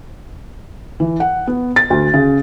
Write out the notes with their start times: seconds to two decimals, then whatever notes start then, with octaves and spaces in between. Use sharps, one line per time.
1.00 E3
1.20 F#5
1.47 B3
1.76 A6
1.90 D2
2.14 C#3